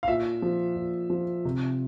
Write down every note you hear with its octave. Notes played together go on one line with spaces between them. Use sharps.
F5
A#2 E5
F3
A#2
F3
C3